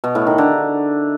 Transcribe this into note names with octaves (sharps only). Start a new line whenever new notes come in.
B2
A2
D#3
D3